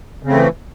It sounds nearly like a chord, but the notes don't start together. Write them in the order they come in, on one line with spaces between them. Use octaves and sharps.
C#3 C4 A3 E3